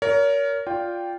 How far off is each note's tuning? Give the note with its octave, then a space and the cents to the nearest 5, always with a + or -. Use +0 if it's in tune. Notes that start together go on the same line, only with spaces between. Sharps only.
A#4 +0 C#5 +35
F4 +0 D5 -15 G5 +0